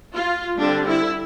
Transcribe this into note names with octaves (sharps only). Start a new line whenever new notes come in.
F4
D3 G3 C4 D4
E4